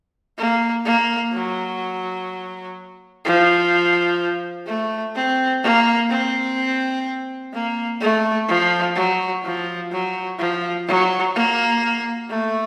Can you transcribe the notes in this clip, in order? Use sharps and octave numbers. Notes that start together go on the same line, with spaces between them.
A#3
A#3
F#3
F3
A3
C4
A#3
C4
A#3
A3
F3
F#3
F3
F#3
F3
F#3
A#3
A3